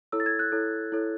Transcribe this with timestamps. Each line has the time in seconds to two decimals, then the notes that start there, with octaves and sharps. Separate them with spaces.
0.12 E4 A4 C#5 E6
0.20 A6
0.26 G#6
0.39 F#6
0.52 E4 A4 C#5
0.92 E4 A4 C#5